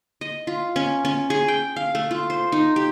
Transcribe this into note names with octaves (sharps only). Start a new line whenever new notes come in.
D#5
F4
C#4
C#4
G#4
G5
F5
A3
F4
C5
D#4
G4